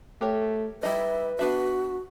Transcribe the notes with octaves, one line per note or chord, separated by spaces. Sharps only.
A3 G4 A#4 C#5
G3 D#4 B4 D#5 E5
B3 D4 F#4 E5